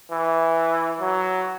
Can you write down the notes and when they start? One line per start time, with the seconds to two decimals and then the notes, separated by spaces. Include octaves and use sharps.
0.11 E3
1.00 F#3